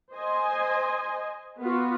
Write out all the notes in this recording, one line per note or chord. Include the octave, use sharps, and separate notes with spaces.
C5 D#5 G#5
B3 F4 F#4 B4